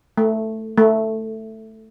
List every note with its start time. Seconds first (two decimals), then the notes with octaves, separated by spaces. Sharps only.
0.17 A3
0.77 A3